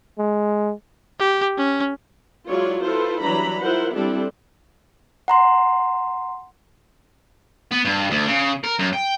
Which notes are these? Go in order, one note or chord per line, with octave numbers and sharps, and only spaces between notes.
G#3
G4
C#4
F#3 G#3 E4 F4 C#5 D5
E4 F4 A4 B4 C5
E3 F#3 G3 D4 A#5 B5
E4 F4 A#4 C5 F#5
G3 C4 D4 E4 G4 A4
F#5 A#5 C6
B3
G2
D2
C#3
A#4
F#2
G5